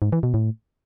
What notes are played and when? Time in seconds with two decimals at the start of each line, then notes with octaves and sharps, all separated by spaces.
0.02 G#2
0.12 E3
0.23 B2
0.34 A2